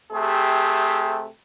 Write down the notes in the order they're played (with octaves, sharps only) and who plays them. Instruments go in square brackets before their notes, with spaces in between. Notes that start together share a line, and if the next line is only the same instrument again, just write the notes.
[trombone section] C3 A3 G4 G#4